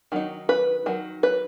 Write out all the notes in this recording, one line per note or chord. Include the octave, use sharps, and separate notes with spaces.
D#3 F#3 D#4
B4
D#3 F#3
B4